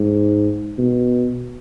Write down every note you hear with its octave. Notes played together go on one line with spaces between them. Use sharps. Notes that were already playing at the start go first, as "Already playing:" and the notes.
Already playing: G#2
B2